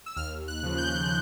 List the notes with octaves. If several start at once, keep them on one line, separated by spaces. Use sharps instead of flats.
E6
D#2 F6
F#6
C#3 F3
G6